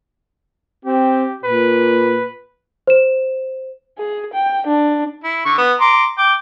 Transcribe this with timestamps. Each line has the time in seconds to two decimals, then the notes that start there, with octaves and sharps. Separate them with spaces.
0.85 C4 G4
1.44 A#2 B4
2.87 C5 E7
3.98 G#4
4.34 G5
4.67 D4
5.24 E4
5.45 D3 C#6
5.58 B3
5.81 A#5 C6 D6
6.18 G5 D6